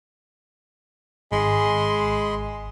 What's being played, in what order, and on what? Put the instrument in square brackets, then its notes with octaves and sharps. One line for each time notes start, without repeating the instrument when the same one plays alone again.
[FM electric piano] G#1 [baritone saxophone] G#3 [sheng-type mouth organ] D#5 B5 C6